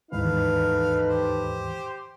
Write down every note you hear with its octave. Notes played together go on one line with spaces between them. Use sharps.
D#2 G#2 E3 D#4 A4 B4 F5
G4 C5